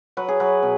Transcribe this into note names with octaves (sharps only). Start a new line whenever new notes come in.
F#3 B4
G#4
F#3 B4
B2